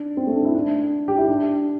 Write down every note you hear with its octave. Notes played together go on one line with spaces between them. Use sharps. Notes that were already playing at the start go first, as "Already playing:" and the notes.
Already playing: D4
C4
A3
D4
E4
D4
G4
E4
D4